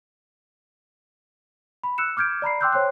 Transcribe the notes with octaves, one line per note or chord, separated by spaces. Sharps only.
B5
E6 F#6 C#7 E7
D6 F6 G6 G#6 D7
D5 A#5 B5 C7
G5 C6 D6 E6 F#6 G6
C5 C#5 G5 C6 F#6